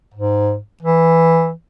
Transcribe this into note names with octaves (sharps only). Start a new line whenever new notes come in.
G#2
E3